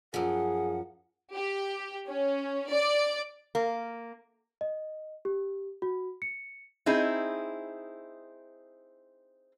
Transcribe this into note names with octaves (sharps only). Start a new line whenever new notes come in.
F#2 F3 G#4 F#5
G4
C#4
D5
A#3
D#5
G4
F#4
C#7
C4 D#4 E4 G#4